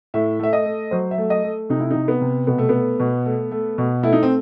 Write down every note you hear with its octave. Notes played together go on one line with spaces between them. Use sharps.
A2 E5
A3 E5
D#5
A3
F#3 C5
E5
A3
D#5
A3
C3 D#4
E4
C3 D#4
B3
C3
B2 B3
A3
A3 B3
B2
A3
A3
B2
A3 E4
D#4
C4